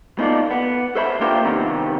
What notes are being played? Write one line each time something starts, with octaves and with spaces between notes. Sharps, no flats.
B3 D#4 F4 A4 D5
B3
A4 C5 E5 B5
A#3 D4 F4 G4 A#4 C5
C3 D#3 G3 B3 C4